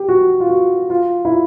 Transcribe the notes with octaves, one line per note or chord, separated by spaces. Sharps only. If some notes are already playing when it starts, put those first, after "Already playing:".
Already playing: G4
F#4
F4
F#4
F4
E4
F4